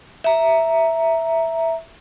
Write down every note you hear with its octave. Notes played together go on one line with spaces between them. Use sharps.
E5 A#5